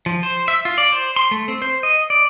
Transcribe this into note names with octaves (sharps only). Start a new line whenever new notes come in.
F3
C5
E5
F4
D5
C5
C6
A3
C4
C5
D#5
D5